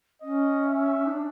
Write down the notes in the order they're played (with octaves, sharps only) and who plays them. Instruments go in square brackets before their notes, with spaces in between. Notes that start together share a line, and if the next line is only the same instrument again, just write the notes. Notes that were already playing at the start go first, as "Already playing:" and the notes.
[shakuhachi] C#4 [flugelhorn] D#5
[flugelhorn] E5
[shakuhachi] D#4
D4